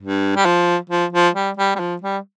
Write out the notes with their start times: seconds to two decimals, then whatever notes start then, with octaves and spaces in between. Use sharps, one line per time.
0.01 G2
0.36 G3
0.45 F3
0.90 F3
1.13 F3
1.35 G3
1.57 G3
1.75 G3
1.80 F3
2.02 G3